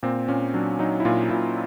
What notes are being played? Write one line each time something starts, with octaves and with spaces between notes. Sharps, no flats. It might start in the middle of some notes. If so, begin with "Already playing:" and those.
A#2 C4
A#2 C#4
F#3 D4
F#3 D#4
E4
A#2 F4
A#2 E4